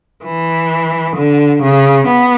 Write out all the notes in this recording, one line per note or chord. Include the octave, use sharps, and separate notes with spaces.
E3
D3
C#3
B3